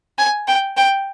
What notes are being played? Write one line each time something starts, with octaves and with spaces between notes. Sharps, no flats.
G#5
G5
G5